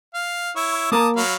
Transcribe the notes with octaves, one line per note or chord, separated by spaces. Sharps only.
F5
E4 C#5 E6
A#3 A#4 A5 A#5 D6 D#6
F#3 F5 B5